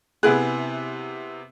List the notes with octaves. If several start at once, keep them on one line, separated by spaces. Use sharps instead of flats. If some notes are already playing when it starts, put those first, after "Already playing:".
C3 B3 E4 G#4 F#6